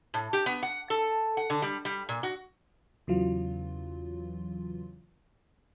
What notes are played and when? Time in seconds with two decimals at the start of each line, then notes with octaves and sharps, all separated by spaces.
0.14 A2
0.33 G4
0.46 B3
0.63 F#5
0.90 A4
1.37 F#5
1.50 D3
1.62 G3
1.85 G3
2.09 A#2
2.23 F#4
3.07 E2 C#3 E3 F#3 F4